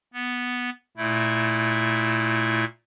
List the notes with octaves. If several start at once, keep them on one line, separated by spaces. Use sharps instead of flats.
B3
A#2 A3 E4